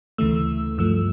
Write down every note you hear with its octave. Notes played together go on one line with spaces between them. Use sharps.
D2 C#3 E3 A3 E6
G2 F3 A3 E6